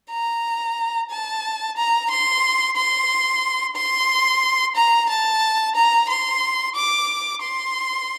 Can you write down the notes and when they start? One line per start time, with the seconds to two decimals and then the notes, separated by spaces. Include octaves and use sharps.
0.11 A#5
1.10 A5
1.77 A#5
2.10 C6
2.76 C6
3.76 C6
4.76 A#5
5.09 A5
5.75 A#5
6.09 C6
6.75 D6
7.42 C6